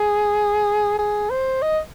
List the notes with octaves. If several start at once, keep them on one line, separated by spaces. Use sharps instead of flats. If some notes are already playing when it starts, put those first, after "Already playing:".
Already playing: G#4
G#4
C5
D#5